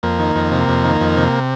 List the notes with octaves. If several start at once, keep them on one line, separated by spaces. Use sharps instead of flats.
F2 A#3
D#3
F2
C3
F2
D#3
F2
C3